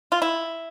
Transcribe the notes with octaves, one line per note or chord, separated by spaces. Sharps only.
F4
E4